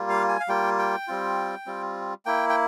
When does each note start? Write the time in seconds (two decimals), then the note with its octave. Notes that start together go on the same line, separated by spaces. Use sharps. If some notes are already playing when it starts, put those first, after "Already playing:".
Already playing: G3 A#3 F4
0.09 F5
0.29 G#5
0.40 F5
0.48 G3 A#3 F4 G5
0.79 G5
1.08 G3 C4 F4
1.66 G3 C4 F4
2.26 A#3 E4 G5
2.49 G5